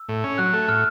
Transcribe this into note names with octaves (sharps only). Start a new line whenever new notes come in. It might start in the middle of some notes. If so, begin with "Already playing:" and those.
Already playing: E6
A2
C#4
F#3 F#6
A3
A2 F6